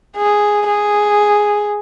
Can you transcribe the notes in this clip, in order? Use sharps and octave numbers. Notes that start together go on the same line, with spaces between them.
G#4
G#4